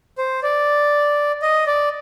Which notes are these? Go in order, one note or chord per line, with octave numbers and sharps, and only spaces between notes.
C5
D5
D#5
D5